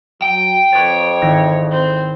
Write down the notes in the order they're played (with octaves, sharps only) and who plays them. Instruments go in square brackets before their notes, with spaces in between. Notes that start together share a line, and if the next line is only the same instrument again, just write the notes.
[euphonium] F#3 [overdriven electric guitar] G5
[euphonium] F2 [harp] B4 D6 A6 [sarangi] C#5
[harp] G#1 E4 A#6
[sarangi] C4